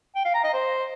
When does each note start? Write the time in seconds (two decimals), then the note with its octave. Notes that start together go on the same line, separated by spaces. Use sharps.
0.15 G5
0.25 F5
0.35 A#5
0.44 D#5
0.54 C5